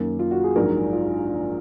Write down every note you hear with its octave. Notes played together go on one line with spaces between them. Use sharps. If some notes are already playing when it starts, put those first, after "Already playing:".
Already playing: F#2 D#3 A#3
F4
F#4
G#4
A#1 G#2 F#3 A#4
F4